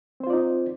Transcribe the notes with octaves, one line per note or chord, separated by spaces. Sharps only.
C4 D#4 F4 C5 D5